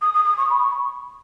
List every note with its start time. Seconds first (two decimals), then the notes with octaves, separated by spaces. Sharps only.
0.02 D#6
0.14 D#6
0.25 D#6
0.38 C#6
0.50 B5
0.63 C#6